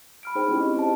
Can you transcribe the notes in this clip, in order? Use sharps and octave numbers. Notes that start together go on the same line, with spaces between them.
B5 F6 D7
D#4 G#4 C5 G5
C4 C#4 E4 G4
D#5
C5 D#5 A5